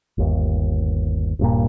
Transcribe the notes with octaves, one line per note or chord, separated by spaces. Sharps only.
G1 D#2
D#1 G2 A#2